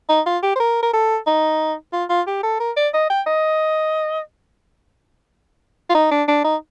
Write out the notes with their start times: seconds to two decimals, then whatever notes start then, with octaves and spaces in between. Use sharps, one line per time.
0.09 D#4
0.26 F4
0.43 G4
0.56 C5
0.60 A#4
0.83 A#4
0.94 A4
1.27 D#4
1.93 F4
2.10 F4
2.27 G4
2.43 A4
2.60 A#4
2.77 D5
2.94 D#5
3.10 G5
3.27 D#5
5.90 F4
5.95 D#4
6.11 D4
6.28 D4
6.44 D#4